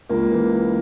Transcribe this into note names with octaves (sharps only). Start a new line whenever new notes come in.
C#2 A#3
E3